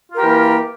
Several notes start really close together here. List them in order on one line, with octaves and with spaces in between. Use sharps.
F4 A#4 G4 A#3 E3